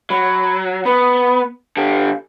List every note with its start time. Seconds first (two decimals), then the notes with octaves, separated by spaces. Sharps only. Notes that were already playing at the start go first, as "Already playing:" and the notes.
0.10 F#3 B5
0.85 B3 B5
1.77 D3 G4 F5